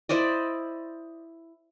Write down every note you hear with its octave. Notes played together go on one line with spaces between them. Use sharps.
E4 C5 D5 D#5